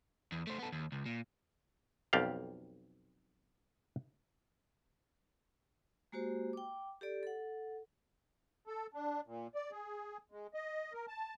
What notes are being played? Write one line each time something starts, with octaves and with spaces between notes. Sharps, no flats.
E2
A3 C5
B3 A4
D#2
C#2
A#2
B1 F2 G4 D5 F5
G#3 A#3 F#4 G4 C5
G5 D6
G4 A4 D5
A4 F#5
A4
D4
A#2
D5
G#4
G#3
D#5
A#4
A5